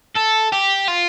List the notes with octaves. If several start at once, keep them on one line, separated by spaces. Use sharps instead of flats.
A4
G4
F4